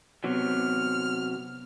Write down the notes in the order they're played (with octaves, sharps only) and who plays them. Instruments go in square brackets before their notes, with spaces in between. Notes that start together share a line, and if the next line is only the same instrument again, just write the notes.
[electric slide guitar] C3 F#3 [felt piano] B3 [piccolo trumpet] F6